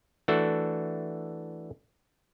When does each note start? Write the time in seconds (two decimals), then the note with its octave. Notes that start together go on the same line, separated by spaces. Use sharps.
0.28 E3 A3 D4 F#4 A4